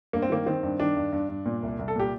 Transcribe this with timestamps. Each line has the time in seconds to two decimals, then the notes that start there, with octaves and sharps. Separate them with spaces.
0.13 G2 A#3
0.22 C4
0.30 D#3 A#3
0.46 D#3 C4
0.63 G2
0.80 D#3 D4
0.97 G2
1.13 G2
1.29 G2
1.46 A#2
1.63 C2
1.79 C2
1.88 A4
1.96 A#2 G4